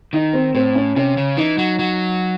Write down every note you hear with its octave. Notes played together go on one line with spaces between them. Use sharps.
D#3 D#4
C4
A2 C4
C#4
C3 C#4
C#3
E3 D#4
F#3
F#3